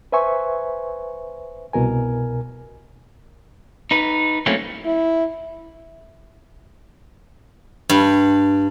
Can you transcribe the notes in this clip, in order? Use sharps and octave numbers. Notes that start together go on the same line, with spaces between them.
B4 C5 E5 G#5 C#6
C2 B2 A#4 G#5
D#4 B4
F#3 A3 A#3 C4 C#4 E4
E4
G2